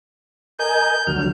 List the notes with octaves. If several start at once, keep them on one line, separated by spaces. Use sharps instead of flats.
A#4 D#5 G#5 G6
D2 F#3 F6